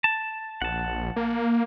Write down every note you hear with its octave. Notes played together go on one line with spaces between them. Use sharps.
A5
A#1 F#5 A5
A#3